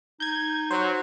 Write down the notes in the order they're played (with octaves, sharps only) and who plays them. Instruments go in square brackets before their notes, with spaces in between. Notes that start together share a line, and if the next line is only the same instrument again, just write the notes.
[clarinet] D#4 [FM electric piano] G6 G#6
[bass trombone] F#3 [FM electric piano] C5